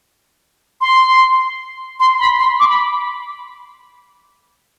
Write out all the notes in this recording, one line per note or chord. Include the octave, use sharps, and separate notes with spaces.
C6
C6
B5
C6
D6
B5